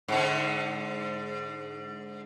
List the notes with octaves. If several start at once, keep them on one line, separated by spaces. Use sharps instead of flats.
G#2 D3